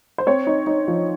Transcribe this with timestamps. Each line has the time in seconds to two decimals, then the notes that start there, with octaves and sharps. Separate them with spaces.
0.18 C5
0.27 C4 C#5
0.47 D#4
0.67 D#4
0.88 F3